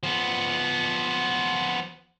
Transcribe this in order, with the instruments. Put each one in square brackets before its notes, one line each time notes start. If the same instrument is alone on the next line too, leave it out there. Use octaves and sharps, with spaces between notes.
[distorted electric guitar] F3 B3